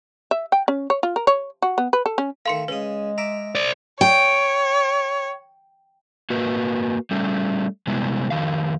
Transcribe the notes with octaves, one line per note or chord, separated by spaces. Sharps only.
E5
G5
C#4
C#5
F4
A#4
C#5
F#4
B3
B4
A4
C#4
D#3 A3 F5 C6 C#7
C#3 G#3 B4 D#6
E5 A#5 D6
C5 D5
C#5 G5
A#3 F#4 A#4 B4
G3 A3 C#4
C3 G3 G#3 B3 E4
F2 G#2 D#3 F5